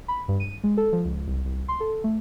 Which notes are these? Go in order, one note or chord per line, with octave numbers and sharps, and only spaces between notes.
B5
G2
D#7
G#3
A4
F3
C#2
C2
C2
C6
A4
A3